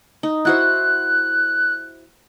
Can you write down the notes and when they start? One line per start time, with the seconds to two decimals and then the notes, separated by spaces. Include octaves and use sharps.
0.23 D#4
0.45 E4 F#4 C5 F#6